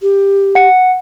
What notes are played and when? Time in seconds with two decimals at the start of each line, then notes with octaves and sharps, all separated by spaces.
0.02 G4
0.55 F#5 C#7